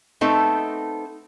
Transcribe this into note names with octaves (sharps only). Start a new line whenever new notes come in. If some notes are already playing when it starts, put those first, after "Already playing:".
A3 B3 C4 D#4 A4